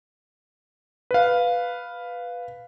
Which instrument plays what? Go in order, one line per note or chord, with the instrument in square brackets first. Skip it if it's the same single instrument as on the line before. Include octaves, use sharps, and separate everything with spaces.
[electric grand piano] B4 F5